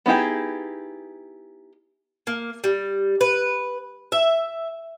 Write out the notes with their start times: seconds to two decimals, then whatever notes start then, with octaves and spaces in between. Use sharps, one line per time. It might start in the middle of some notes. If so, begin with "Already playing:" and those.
0.06 B3 D#4 E4 G4 G#4
2.27 A#3
2.64 G3
3.21 B4
4.12 E5